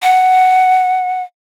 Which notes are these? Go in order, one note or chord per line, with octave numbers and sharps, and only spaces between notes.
F#5